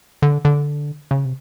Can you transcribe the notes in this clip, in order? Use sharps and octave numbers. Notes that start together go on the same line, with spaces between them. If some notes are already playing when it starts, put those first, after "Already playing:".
D3
D3
C#3
C3